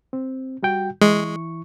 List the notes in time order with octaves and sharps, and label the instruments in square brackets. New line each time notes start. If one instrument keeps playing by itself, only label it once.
[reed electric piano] C4
G3 F#4 G5
[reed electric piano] E3 E4 C#6 [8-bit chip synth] G#3